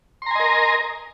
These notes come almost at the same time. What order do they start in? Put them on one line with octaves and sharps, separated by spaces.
C6 A#5 G#5 D#5 A#4